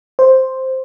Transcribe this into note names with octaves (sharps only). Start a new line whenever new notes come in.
C5